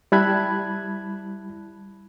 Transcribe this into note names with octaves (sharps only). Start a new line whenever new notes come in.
G3 E4 A5 B5 F#6 G#6